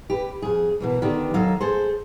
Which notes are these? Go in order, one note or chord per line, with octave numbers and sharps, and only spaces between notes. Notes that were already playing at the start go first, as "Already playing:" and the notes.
G4 B4
F2 G#4
B2 E3 A#3
D3 D#3 B3 D4 G4
D#2 F#3 D#4 A4 F5
G#4 A4 C5